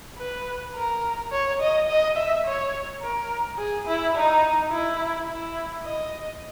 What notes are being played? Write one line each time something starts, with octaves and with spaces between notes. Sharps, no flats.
B4
A#4
C#5
D#5
D#5
E5
C#5
A#4
G#4
E4
D#4
E4
E4
D#5